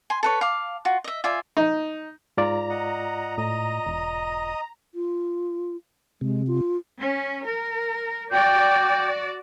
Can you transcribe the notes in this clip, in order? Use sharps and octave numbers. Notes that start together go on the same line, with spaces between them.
G#5 C6
A4 B4 C#5
F5 D6
F4 F#4
D#5 E5
F4 D5 E5 G#5
D#4
G#2 F4 D5 A#5
D#5 F#5
A2 D#5 D#6
E1
F4
C3 G#3
F4
C#4
A#4
F#4 D5 G5 D6 G6